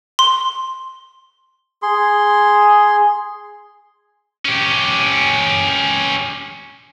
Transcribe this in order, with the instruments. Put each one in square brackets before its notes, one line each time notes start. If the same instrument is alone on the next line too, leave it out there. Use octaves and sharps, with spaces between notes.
[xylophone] C6
[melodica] G#4 C6
[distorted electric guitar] C#4 G4